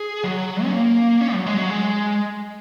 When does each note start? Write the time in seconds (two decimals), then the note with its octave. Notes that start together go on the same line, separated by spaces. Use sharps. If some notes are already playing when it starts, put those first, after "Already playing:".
Already playing: G#4
0.24 F#3
0.64 C#4
0.72 A#3
1.21 C#4
1.34 F#3
1.46 G#3
1.58 F#3
1.69 G#3